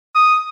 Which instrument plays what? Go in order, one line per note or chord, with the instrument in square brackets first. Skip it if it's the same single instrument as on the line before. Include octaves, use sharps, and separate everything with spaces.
[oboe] D#6